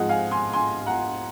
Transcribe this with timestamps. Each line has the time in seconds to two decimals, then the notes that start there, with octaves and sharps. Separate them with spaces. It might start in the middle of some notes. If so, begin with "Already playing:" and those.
Already playing: G#2 F3 G#3 C4 D#5 F#5
0.09 F5 G#5
0.31 G#5 C6
0.53 G#5 C6
0.86 F#5 A#5